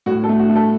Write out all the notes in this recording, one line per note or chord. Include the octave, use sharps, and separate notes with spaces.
A2 F#4
A4
A3
F#4
A3
A4